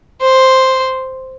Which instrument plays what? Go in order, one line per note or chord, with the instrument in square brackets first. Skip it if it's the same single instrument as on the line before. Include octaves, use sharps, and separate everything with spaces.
[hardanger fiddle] C5